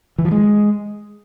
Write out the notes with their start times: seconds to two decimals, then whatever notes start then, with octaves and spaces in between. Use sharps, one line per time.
0.19 E3
0.25 F3
0.31 G#3